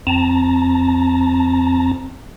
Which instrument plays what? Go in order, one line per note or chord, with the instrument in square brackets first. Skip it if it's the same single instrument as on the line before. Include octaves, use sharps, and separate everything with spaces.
[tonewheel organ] F2 C4 A5 A#5